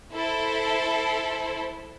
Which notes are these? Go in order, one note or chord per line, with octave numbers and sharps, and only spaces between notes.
E4 A4 C5